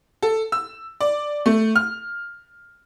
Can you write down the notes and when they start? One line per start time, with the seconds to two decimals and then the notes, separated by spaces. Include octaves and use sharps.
0.22 A4
0.52 E6
1.01 D5
1.46 A3
1.76 F6